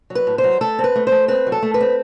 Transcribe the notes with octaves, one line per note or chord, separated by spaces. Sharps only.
F#3
B4
A2
C5
F#3
A3 A4
C4
B4
A3
C5
A3
C4 B4
F#3
A4
A3
B4
C4